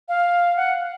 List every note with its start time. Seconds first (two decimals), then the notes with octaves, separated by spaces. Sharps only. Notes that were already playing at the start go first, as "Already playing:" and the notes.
0.09 F5
0.56 F#5